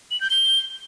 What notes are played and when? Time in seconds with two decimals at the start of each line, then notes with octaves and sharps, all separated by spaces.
0.11 F#7
0.21 G6
0.30 G7